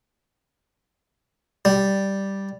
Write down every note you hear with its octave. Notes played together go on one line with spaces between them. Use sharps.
G3